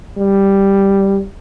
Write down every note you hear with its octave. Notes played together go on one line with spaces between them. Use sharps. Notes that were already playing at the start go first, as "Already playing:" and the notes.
G3